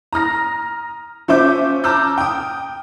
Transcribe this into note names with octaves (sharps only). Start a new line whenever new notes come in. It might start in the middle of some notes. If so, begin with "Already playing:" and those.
A#5 D#6 F6 A#6
F3 C#4 C5 E5 D6 G6
A5 A#5 D6 E6 F6 G6
G5 D#6